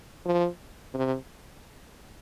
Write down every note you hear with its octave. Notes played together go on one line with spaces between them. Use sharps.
F3
C3